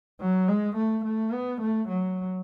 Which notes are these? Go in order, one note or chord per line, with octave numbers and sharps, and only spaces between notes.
F#3
G#3
A3
A3
B3
A3
F#3